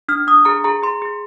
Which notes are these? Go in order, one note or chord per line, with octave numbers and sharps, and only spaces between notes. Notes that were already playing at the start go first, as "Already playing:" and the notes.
D4 F6
D4 D#6
G#4 A#5
G#4 A#5
G#4 C6
G#4